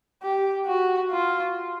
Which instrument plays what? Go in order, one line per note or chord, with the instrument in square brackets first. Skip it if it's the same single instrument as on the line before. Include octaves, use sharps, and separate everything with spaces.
[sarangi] G4
F#4
F4